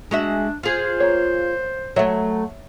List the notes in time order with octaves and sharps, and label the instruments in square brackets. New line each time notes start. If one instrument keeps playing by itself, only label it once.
[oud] G#3 F#4 E5 [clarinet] D4
[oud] F4 G#4 [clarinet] C5
[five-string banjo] A#3 C#5
[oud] F#3 A3 [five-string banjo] C#5 E5